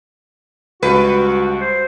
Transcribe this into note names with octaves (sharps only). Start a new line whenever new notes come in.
C#2 G3 F#4 B4
C5